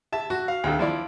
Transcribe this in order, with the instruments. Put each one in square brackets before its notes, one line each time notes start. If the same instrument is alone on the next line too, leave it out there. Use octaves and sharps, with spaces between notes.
[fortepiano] E5 A5
[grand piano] F#4
F5
[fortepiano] D2 D#3 A4
F3 E4 D5